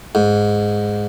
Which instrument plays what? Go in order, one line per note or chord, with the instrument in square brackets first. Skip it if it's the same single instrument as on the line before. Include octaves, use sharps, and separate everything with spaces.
[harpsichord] G#2